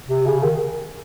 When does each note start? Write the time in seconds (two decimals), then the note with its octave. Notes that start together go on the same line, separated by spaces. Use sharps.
0.09 C3
0.26 C#3
0.43 D#3